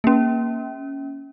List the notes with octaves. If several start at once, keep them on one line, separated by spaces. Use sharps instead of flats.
A#3 C#4